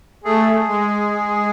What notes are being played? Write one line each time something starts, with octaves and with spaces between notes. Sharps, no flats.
A3 G#4
G#3